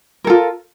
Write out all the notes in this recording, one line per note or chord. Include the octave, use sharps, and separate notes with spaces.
F4 A4 A#4